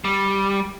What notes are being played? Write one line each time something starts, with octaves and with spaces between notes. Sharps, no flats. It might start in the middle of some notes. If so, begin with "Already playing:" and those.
G3